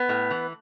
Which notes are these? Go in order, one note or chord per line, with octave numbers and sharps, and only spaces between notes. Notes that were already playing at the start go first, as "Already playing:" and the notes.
Already playing: B3
A2
E3